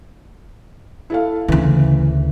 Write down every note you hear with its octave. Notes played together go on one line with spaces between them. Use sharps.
E4 A4 F5
D2 C#3 E3